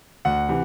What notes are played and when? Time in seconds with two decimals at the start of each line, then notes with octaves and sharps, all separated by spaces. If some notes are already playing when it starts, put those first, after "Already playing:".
0.25 D2 F#5
0.49 C3 E3